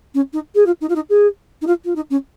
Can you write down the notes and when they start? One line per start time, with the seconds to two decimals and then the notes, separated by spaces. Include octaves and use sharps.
0.14 C#4
0.33 D#4
0.55 G#4
0.66 F4
0.81 D#4
0.89 F4
0.95 D#4
1.09 G#4
1.61 D#4
1.66 F4
1.84 F4
1.95 D#4
2.10 C#4